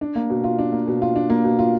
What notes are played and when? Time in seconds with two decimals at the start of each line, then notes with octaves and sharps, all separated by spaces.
0.01 D4
0.16 A#3
0.30 B2
0.44 F4
0.59 D4
0.72 A#3
0.88 B2
1.02 F4
1.16 D4
1.30 A#3
1.44 B2
1.59 F4